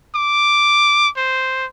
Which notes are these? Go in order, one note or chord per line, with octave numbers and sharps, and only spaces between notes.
D6
C5